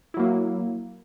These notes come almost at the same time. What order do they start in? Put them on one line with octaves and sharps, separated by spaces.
E4 F#3 A#3